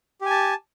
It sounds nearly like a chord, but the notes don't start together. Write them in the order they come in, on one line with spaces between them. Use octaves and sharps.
G4 G#5 A5